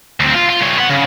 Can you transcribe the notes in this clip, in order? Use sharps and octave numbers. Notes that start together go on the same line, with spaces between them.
D2 C4
F4
F4
G2 C#5
B3 F#5
C#3